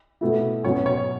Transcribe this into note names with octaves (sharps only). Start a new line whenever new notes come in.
B2 A3 E4
B2 F#3 C#4 C#5
C#5